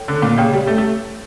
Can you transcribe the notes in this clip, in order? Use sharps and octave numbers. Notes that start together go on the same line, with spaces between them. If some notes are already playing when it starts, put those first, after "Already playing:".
Already playing: A4 C#5 G5
D3
A#2
C#3 G4 C#5 G5
G3
A3
A3